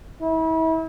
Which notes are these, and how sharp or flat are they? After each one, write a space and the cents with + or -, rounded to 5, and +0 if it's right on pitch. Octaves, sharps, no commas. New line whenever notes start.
E4 -35